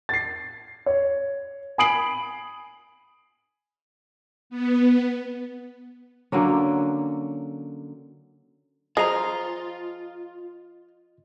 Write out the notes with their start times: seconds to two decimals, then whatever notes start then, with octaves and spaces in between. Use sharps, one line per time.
0.09 A6 C7
0.86 C#5
1.78 G#5 B5 D#6 C7 D7 F#7
4.50 B3
6.32 D3 F#3 A#3 C#4
8.97 F3 F4 G#4 D#5 A#5